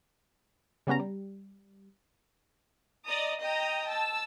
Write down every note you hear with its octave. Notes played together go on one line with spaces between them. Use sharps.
C#3 G3 B3 C#4 A#5
G3
D5 D#5 A#5 D#6
D#5 G5 A#5 D#6
A5 E6